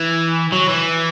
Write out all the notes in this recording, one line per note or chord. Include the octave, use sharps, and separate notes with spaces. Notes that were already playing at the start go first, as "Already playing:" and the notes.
Already playing: E3
F#3
E3